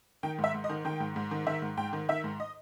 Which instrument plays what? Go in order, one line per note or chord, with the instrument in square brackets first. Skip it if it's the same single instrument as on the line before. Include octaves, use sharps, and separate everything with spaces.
[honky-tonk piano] D#3 G5
G#2
E5
G#2
D#5
D#3
D#3 G5
G#2
G#2
D#3
D#3 E5
G#2
G#2 G5
D#3
D#3 E5
G#2
D#5